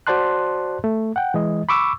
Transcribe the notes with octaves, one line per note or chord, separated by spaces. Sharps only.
F#4 C5 D5 A5 C6 F#6
A3
F#5 G5
E3 G#3 D#5
B5 C#6 D6 E6